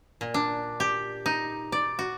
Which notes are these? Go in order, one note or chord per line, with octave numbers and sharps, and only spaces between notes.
A#2
D4
G4
D#4
D5
F#4